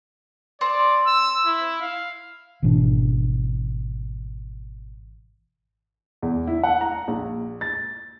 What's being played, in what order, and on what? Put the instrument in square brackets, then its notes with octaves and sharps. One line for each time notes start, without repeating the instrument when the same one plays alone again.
[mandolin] C4 [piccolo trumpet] D5
[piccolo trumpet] E6
E4
F5
[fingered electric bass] G#1 B2 E3 D4
[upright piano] E2
E4
F#5
A#5
A#1
A6